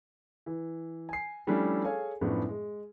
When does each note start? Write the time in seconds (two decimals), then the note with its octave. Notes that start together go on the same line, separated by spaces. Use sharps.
0.46 E3
1.09 G#5 C7
1.47 F3 G3 A3 C#4 D4 E4
1.84 G#4 A4 C#5 F5 G#5
2.21 F#2 A2 F3 B3 D4
2.49 G#3